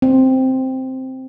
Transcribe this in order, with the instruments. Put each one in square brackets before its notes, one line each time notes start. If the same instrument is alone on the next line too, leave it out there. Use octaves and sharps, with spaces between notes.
[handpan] C4